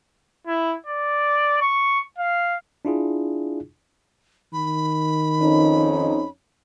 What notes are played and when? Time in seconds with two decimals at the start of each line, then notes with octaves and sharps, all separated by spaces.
0.47 E4
0.87 D5
1.61 C#6
2.18 F5
2.85 D4 E4 F4 G#4
4.53 D#3 B5
5.41 F2 C#4 D#4